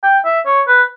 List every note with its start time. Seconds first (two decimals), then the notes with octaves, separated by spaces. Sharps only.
0.03 G5
0.25 E5
0.46 C#5
0.68 B4